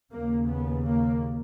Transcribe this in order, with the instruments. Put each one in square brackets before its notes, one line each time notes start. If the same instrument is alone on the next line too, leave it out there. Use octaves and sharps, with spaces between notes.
[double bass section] D#2 C#3 A#3
B3
A#3